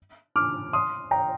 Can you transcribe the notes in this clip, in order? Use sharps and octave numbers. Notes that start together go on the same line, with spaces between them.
D6 F6
C6 D#6
G5 A#5